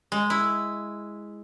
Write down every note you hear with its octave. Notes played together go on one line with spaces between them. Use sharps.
G#3
E4